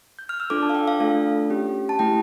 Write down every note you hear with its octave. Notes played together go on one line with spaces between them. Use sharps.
G6
F6
E6
D4 F4 A4 D6
A5
F5
G5
F5
A3 D4 F4 A4
C#4 G4
A5
A3 E4 G4 G5